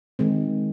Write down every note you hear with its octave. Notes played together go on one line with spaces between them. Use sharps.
D#3 G#3 C4